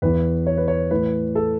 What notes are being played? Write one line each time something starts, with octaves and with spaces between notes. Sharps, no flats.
E2 E3 B4
C#5
B4
C#5
A2 E3 B4
A4